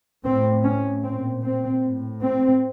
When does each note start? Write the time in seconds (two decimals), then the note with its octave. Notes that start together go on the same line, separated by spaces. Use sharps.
0.24 A2 C4
0.64 C#4
1.03 A#2 C4
1.44 C4
1.83 A2
2.22 C4